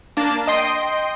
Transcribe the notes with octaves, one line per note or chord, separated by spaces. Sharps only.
A#3 D4 A5
D#5 G5 C6